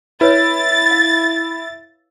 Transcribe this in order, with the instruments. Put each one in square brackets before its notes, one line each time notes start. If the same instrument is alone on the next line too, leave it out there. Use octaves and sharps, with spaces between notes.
[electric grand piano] E4 [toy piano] B4 C#5 [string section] A6
[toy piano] F5